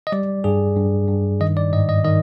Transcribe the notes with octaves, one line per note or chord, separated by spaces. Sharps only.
D#5
G3 D5
G2 G#4
G2
G2
D#3 D#5
D5
G#2 D#5
D#5
D#3 D#5